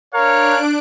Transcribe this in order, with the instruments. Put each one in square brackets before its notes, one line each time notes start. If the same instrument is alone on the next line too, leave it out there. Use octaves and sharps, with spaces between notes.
[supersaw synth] D4 F#6 D7 [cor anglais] A#4 [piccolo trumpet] C#5 [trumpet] F5